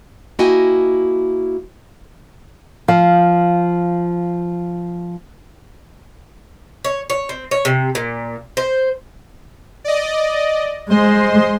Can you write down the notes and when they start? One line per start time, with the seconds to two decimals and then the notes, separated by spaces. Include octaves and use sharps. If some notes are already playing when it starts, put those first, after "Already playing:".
0.39 A#3 E4 F#4 D#5 G5 G#5
2.88 F3 F5
6.84 C#5
7.10 C#5
7.29 C4
7.51 C#5
7.65 C3
7.95 A#2
8.57 C5
9.84 D5 D#5
10.90 G#3 C5 D#5 C6